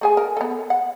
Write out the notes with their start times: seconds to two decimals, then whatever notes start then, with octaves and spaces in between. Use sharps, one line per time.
0.01 A3 G#4 G#5
0.17 A#4
0.37 B3 A4
0.70 F#5